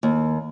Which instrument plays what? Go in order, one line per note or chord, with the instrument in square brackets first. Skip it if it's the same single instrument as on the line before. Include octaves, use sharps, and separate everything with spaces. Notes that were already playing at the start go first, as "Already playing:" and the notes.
[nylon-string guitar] D#2